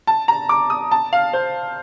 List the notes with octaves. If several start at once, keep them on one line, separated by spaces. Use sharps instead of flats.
A5
A#5
D6
D#6
A5
F5
C5